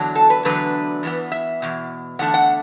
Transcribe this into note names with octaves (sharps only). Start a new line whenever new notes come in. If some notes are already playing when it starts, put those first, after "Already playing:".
Already playing: E2 D3 F#3 D4
A4
B4
E2 D3 F#3 A3 D4 B4
E2 E3 B3
E5
E2 B2
E2 D3 A3 D4 F#5
F#5